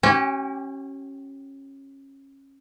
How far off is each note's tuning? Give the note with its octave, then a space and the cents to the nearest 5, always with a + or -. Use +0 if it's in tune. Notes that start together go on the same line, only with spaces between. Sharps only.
C#4 -20 G4 -40 G5 +45